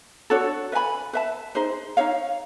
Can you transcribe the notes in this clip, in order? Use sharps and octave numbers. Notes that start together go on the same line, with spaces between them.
D4 F#4 A4 C#5
B4 E5 G#5 B5
B4 E5 A5
D#4 G#4 C5
D#4 G#4 C#5 F5